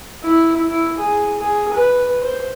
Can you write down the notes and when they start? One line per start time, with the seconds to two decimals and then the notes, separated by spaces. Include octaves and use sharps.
0.23 E4
0.69 E4
0.98 G#4
1.40 G#4
1.74 B4
2.22 C5